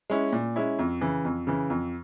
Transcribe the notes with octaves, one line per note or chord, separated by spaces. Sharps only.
G#3 C#4 E4
A#2
G#3 C#4 E4
F2
C#3 E3
F2
C#3 E3
F2